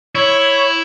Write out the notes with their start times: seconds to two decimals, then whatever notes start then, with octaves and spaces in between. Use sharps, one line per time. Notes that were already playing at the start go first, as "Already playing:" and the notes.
0.15 E4 C#5